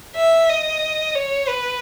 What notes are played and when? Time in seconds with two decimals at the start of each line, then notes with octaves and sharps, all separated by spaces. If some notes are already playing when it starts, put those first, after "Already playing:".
0.16 E5
0.49 D#5
1.15 C#5
1.48 B4